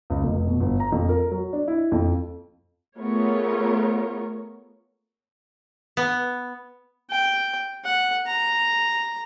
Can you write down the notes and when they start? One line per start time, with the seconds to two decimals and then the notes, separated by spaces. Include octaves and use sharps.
0.10 C#2
0.24 F1
0.47 B2
0.60 G1
0.80 A#5
0.92 F2
1.09 A#4
1.31 F#3
1.53 D4
1.68 E4
1.92 F2
2.98 A3 B3 F4 G#4 A#4 C#5
5.97 B3
7.10 G5
7.85 F#5
8.27 A#5